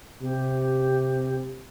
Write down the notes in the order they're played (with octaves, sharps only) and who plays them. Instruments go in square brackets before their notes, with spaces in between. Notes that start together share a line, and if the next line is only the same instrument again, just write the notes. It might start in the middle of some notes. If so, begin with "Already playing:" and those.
[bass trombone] C3 [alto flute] G4